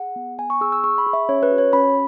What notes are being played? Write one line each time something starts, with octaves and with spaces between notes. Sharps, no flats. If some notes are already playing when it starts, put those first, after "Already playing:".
Already playing: G#4 F#5
B3
B3 G#5
C#6
G#4 E6
E6
G#4 C#6
B5
G#4
E5
C#4 C#5
B4
F#4
C#5
C#4 B5